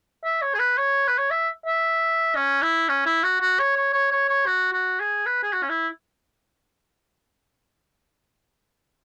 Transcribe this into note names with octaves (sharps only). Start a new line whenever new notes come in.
E5
C#5
G#4
B4
C#5
B4
C#5
E5
E5
C#4
E4
C#4
E4
F#4
F#4
C#5
C#5
C#5
C#5
C#5
F#4
F#4
G#4
B4
G#4
F#4
C#4
E4